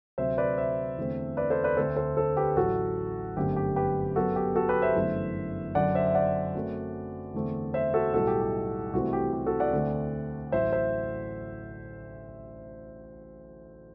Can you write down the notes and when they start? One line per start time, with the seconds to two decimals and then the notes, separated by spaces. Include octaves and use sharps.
0.18 D2 C3 F#3 C4 C5 E5
0.38 B4 D5
0.58 C5 E5
0.97 E2 D3 A3 C4
1.37 B4 D5
1.50 A4 C5
1.64 B4 D5
1.77 D2 D3 A3 C4 A4 C5
1.96 A4 C5
2.17 A4 C5
2.37 G4 B4
2.56 A1 A2 F#3 F#4 A4
3.37 G1 F#2 D3 A3 C4 G4
3.56 G4
3.76 G4 B4
4.16 F#2 F#3 B3 F#4 A4
4.36 G4
4.56 F#4 A4
4.69 G4 B4
4.82 C5 E5
4.96 G1 F#2 E3 A3
5.75 F#2 D3 F#3 D5 F#5
5.95 C5 E5
6.07 E5
6.15 D5 F#5
6.55 F#2 F#3 A3 C4
7.34 E2 D3 A3 C4
7.74 C5 E5
7.94 F#4 A4
8.14 B1 A2 G3 F#4 A4
8.27 G4
8.41 G4
8.93 C2 C3 E3 A3 C4 F#4
9.13 G4
9.33 G4
9.46 F#4 A4
9.60 D5 F#5
9.73 D2 D3 A3 C4
10.52 A1 A2 F#3 C5 E5
10.73 C5 E5